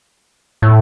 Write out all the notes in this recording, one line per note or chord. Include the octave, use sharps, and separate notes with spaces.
A2